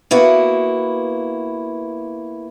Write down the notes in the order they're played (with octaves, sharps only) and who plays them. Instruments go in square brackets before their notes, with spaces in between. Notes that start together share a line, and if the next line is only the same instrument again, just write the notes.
[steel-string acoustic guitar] A#3 B3 E4 F#4